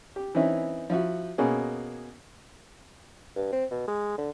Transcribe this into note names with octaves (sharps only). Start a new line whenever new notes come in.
G4
E3 C4 C#4 D#4 E4
F3 E4 F#4
B2 A#3 C#4 G#4
G2
C4
B2
G#3
D3